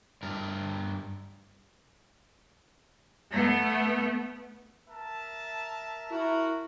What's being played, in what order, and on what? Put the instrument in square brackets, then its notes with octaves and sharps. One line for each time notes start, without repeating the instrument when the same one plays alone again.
[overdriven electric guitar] G2 A#4
[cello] A3 B3
[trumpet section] A#4 E5 A5
[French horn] E4 [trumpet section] F#4 A#4